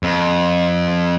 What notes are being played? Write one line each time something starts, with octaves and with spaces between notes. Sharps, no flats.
F2